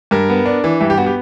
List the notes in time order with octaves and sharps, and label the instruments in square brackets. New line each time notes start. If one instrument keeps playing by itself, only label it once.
[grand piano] G2 A#4
B3
D4
E3
G2 E5
G4
B3 F#4
G4